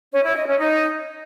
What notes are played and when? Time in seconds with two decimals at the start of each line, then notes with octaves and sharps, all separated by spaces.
0.13 C#4
0.24 E4
0.36 D#5
0.48 C#4
0.59 D#4